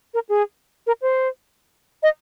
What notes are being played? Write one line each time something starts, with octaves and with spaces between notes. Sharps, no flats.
A#4
G#4
A#4
C5
D#5